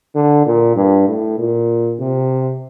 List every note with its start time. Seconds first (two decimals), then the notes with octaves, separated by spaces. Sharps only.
0.15 D3
0.47 A#2
0.76 G2
1.08 A2
1.39 A#2
1.99 C3